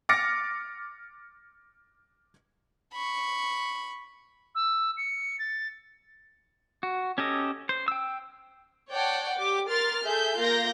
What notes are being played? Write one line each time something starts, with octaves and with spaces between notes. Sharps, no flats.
D6 F6 A6 A#6 C#7 D7
B5 C#6
E6
C#7
A6
F#4
C#4 G4 A4 D#5
C5
G5 E6
C#5 D5 F#5 G5 A5
G4 D6
A#4 C6 F6 A6
G#4 A4 E5 G6
A#3 F4 A#4 F5 G6 A#6